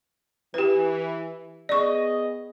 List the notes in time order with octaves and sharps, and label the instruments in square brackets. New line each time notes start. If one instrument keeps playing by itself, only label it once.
[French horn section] E3 [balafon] G4 B4
[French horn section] B3 G#4 D#5 [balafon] D5 C#6